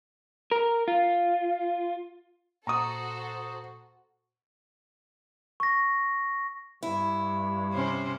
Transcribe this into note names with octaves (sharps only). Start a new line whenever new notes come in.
A#4
F4
A#2 F#4 A4 C5 A#5 C#6 D#6
C#6 A#6
G2 E4
C3 C#4 C5